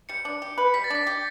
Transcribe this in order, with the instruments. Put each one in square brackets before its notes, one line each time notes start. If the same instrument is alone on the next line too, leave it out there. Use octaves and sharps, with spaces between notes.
[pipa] G3 [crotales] C#7
[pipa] D4
G4
B4
[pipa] G3 [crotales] B6
[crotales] A6
[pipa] D4 [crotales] B6
[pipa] G4